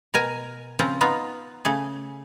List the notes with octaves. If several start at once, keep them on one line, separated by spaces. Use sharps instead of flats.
B2 A#4 G#5 A#5
C#3 F3 C4 F4
B3 D#4 F4
C#3 A3 G#4